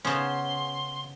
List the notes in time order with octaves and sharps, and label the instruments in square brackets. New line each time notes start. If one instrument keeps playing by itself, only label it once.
[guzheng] C#3 B3 [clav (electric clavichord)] C#4 C5 [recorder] C6